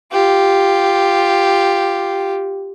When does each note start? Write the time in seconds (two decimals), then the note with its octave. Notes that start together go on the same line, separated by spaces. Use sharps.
0.12 F4 G4